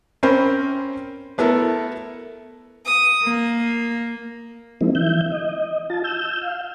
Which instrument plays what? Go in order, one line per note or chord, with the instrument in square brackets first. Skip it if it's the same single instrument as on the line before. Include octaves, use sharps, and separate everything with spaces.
[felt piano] C4 C#4 A#4 C5 G5 B5
A3 B3 E4 A4 A#4
[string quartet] D#6
A#3
[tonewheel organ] F3 G#3 A#3 C4 D#4 E4
E3 E5 G6
D#5
F4 A5
E6 G6
F5